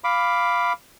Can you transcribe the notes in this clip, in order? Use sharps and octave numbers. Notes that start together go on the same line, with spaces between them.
F5 B5 D6